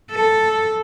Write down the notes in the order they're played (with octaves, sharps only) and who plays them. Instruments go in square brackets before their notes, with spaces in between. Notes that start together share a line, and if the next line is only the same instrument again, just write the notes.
[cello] A4